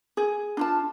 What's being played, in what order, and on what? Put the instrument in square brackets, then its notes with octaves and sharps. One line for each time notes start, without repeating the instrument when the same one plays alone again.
[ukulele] G#4
D4 F4 A5